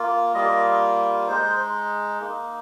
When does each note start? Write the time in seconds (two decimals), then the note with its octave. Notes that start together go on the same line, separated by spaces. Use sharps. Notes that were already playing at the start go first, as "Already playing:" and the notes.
Already playing: A#3 F4
0.34 G3 A#3 F4 D#5
1.27 G#3 D#4 C5
2.21 A#3 D#4